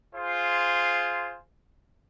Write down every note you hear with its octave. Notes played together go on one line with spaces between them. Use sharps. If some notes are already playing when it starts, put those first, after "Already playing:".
F4 G#4 C5